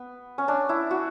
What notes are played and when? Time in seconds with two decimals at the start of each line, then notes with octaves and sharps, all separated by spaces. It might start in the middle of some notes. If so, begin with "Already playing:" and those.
Already playing: B3
0.38 C#4
0.48 D4
0.69 E4
0.91 F#4